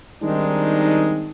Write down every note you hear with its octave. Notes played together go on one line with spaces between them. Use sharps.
D#3 G3 G#3 C4 D4 D#4